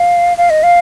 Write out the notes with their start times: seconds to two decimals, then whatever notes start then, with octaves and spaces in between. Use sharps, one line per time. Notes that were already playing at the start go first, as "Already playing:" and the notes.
Already playing: F5
0.38 F5
0.50 D#5
0.63 F5